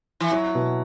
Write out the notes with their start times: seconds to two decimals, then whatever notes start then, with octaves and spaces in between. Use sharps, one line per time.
0.20 E3
0.31 F#3 E4
0.55 B2